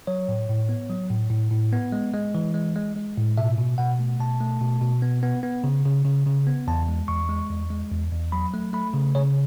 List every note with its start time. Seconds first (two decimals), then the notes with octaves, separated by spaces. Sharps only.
0.07 F#3 C#5
0.28 A2
0.49 A2
0.69 B3
0.90 F#3
1.10 A2
1.30 A2
1.51 A2
1.73 B3
1.92 G#3
2.13 G#3
2.35 E3
2.54 G#3
2.76 G#3
2.96 G#3
3.17 A2
3.38 B2 E5
3.58 B2
3.78 B2 F#5
3.99 A3
4.20 B2 A5
4.41 A3
4.61 B2
4.82 B2
5.02 B3
5.23 B3
5.43 B3
5.64 C#3
5.85 C#3
6.05 C#3
6.26 C#3
6.47 B3
6.67 E2 A5
6.89 G#3
7.08 E2 C#6
7.29 G#3
7.50 E2
7.71 G#3
7.91 E2
8.12 E2
8.32 F#3 B5
8.54 A3
8.73 A3 B5
8.94 C#3
9.15 C#3 C#5